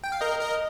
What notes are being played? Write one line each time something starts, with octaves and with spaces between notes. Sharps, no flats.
G5
F5
A#4 D#5
A#4 D#5